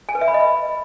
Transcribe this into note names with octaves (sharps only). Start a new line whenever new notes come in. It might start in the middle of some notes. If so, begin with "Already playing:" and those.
G#5
B4
E5
B5
D#5